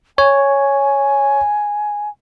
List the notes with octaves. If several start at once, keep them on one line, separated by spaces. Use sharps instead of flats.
C#5 G#5